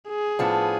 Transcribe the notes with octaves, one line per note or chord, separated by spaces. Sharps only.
G#4
A2 F3 B3 D4